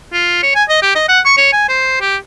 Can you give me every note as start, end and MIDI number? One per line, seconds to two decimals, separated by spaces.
0.13 0.39 65
0.43 0.52 73
0.55 0.64 80
0.69 0.78 75
0.82 0.92 67
0.95 1.08 75
1.08 1.20 78
1.25 1.34 85
1.37 1.51 73
1.52 1.67 80
1.69 1.98 72
2.01 2.17 67